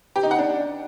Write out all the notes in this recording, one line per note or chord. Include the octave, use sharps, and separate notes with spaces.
G4
D#4
F#5
D4